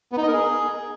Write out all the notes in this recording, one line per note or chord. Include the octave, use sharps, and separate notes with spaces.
B3
D#4
D#5
A#4
G#4